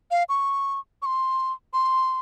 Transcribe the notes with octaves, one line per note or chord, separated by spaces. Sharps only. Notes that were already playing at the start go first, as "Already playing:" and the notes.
F5
C#6
C#6
C6
C6